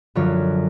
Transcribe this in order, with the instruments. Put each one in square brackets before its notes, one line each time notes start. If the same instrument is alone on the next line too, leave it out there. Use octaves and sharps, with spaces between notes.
[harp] F#2 D3 F3 C#5